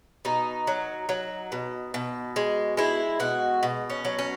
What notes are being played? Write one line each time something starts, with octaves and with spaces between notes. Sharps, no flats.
B2 D#4
F#3
F#3
B2
B2
G#3
G#3 E4
B2 F#4
B2
C#4
F#3
C#4